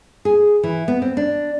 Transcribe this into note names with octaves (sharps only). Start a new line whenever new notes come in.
G#4
E3
B3
C4
D4